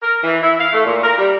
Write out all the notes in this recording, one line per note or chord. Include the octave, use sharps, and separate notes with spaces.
A#4
E3
E4
F5
A3
A#2
A#4
G3